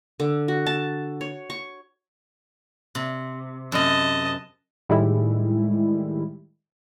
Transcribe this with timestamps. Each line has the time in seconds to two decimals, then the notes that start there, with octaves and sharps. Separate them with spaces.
0.20 D3
0.48 F#4
0.66 A5
1.21 C#5
1.50 C#6
2.95 C3
3.72 F#2 C3 D#5 A5
4.89 A2 D#3 G3 G#3 E4